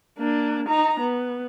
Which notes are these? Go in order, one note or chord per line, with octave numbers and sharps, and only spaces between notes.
A#3 D4
D#4 A#5
B3